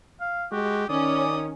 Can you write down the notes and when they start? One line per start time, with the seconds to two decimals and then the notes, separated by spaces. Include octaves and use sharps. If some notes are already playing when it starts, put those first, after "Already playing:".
0.21 F5
0.52 G#3 F#4 G4
0.89 D#3 C#4 D5 D#6